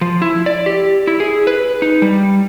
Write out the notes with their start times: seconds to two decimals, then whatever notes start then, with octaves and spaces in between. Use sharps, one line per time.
0.01 F3
0.22 E4
0.46 D5
0.66 G4
1.07 E4
1.20 G#4
1.47 B4
1.82 D#4
2.02 G3